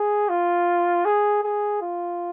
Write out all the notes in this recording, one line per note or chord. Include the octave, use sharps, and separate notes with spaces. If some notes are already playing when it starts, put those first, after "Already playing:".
Already playing: G#4
F4
G#4
G#4
F4